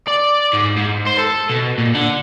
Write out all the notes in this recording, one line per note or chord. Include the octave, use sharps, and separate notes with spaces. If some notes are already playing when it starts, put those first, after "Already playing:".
D5
G#2
G#2
C5
A4
B2
A#2
D3